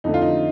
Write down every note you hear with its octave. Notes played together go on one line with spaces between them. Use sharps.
F2 D3 A3 D#4
F4
D#4